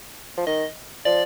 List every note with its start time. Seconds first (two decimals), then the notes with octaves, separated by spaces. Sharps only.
0.37 F3
0.47 D#3 D#5
1.05 F3 D5